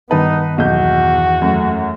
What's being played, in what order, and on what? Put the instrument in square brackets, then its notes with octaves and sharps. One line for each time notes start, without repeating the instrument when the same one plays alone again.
[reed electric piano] G2 D#3 A5 [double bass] B3 [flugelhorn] D#4 [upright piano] B4
[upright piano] B1 G6 [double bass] E2 [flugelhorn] F#4
[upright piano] F#2 A3